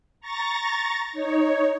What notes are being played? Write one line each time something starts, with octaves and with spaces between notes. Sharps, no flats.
A#5 C#6 A6 A#6
D#4 C#5